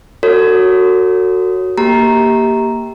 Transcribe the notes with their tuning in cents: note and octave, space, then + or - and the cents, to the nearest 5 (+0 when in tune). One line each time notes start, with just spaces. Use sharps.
F#4 +0 A4 +40 C#5 +0
A#3 +0 G4 +0 A#5 +0